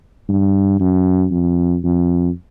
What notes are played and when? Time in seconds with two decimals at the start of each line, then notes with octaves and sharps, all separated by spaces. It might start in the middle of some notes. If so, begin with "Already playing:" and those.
0.29 G2
0.80 F#2
1.31 F2
1.83 F2